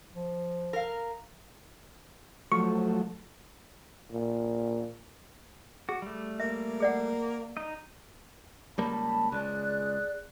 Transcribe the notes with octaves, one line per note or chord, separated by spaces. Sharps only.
F3
A#4 F5
F3 F#3 A3 C#6
A#2
F#4 G#4
G3 A3
A#3 E5
G#4 D5 F#5
D#4 D#5
C#2 G3 A#3 A5 B5
C#2 G#4 D5 F#6